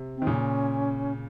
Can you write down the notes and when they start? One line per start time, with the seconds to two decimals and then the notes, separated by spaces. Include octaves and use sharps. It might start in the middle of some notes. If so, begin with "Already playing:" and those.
Already playing: C3
0.16 C4
0.22 D#3
0.27 A#2 C#3 C#4